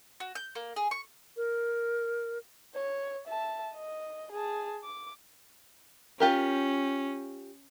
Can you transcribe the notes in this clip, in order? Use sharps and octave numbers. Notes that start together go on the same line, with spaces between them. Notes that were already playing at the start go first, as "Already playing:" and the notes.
F#4
G6
A#3
G#4
C#6
A#4
C#5
E5 A5
D#5
G#4 A5
D6
C#4 F4 G4 A#4